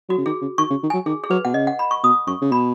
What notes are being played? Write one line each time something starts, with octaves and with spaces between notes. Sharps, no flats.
F#3 F#4
C#3
D#3 G#4
C#3
D#3 C#6
C#3
D#3
F#3 G#5
D#3 G#4
G#4
F#3 B4
B2 F#5
C#3 D#5
F#5
B5
C#6
B2 D#6
F#2 C#6
C#3
B2 B5